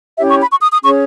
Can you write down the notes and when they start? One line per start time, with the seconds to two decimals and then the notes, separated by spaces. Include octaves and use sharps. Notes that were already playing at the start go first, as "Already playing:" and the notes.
0.18 C#4 E4 G4 C#5 E5
0.29 C#6
0.41 B5
0.51 C#6
0.62 D#6
0.73 D#6
0.83 C#4 G#4 C#5 C#6